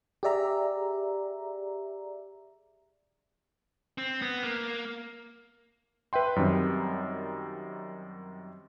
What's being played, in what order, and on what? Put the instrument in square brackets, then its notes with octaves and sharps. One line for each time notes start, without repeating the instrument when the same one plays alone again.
[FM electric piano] G4 G#4 D5 E5 A#5
[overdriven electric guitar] C4
B3
A#3
[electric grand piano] B4 E5 G5 C6
F#2 D#3 G3 C4